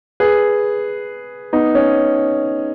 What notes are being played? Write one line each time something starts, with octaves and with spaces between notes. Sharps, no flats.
G#4 B4
B3 D#4
C#4